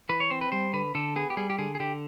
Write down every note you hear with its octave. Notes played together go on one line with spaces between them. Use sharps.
E3 B4
C#5
C4 C5
B4
G3 C5
D3 B4
D3 A4
B3 G#4
G4
G3 G#4
G4
D3 G#4
G#4
D3 G4